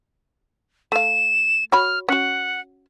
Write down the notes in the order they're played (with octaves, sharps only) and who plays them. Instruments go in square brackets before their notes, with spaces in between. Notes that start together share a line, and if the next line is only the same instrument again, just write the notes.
[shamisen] A3 F5 [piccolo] E7
[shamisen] F#4 C#5 B5 [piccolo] F6
[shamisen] C#4 F#4 [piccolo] F#5